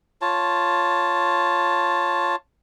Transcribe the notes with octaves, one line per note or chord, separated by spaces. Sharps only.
F4 C#5 A5